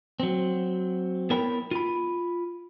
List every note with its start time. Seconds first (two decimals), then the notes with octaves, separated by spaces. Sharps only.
0.20 F#3 C4
1.30 B3 E4 A#4 C#5 G5 B5
1.71 F4 B5